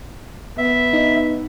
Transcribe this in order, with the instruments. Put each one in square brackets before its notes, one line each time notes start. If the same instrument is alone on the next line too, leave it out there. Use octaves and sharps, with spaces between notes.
[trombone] B3 [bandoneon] E5
[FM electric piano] D#4